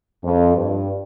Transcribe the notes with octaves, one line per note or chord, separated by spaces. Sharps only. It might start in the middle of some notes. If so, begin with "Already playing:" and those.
F2
G2